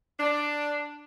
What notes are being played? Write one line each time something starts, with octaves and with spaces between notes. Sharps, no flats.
D4